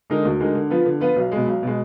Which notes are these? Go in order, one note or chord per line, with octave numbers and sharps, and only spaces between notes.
D3 G#3 D#4 A#4
D2
D3 G#3 D#4 A#4
D3
F3 B3 F4 B4
D3
F3 B3 F4 B4
B1
B2 G#3
B1
B2 G#3